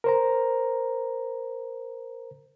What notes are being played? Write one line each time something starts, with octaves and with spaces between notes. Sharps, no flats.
A#4 C5 A#5